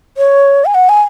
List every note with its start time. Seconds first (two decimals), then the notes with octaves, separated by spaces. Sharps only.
0.17 C#5
0.65 G#5
0.75 F#5
0.89 G#5